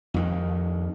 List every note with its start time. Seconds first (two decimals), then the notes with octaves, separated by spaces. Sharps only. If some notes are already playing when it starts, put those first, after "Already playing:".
0.14 F2 D#3